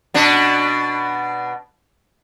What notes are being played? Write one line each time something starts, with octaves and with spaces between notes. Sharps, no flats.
B2 D4